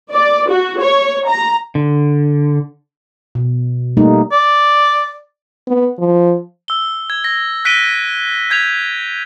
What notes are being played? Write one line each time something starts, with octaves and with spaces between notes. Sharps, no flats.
D5
F#4
C#5
A#5
D3
B2
G3 A3 A#3 D#4
D5
B3
F3
E6 G7
G#6
A#6
F#6 B6 D7 D#7 G7
G6 G#6 B6 F7